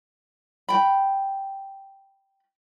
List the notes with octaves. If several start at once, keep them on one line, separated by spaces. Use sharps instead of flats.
G5 B5